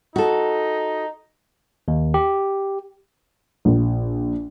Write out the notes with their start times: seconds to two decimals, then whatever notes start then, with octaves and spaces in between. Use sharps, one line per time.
0.16 D#4 F#4 A4
1.88 D#2
2.14 G4
3.65 A#1